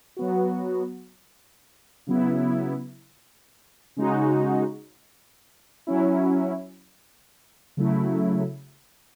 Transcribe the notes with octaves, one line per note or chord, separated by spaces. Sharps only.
F#3 B3 F#4
C#3 F#3 B3 E4
C#3 G#3 D#4 F#4
F#3 C#4 E4
C#3 F#3 A3 E4